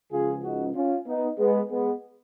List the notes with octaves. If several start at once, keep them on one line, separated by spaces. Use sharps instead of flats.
C#2 C#3 F3 F4 G#4
D#4 F#4
C#4 F4
B3 D#4
G#3 B3
G#3 B3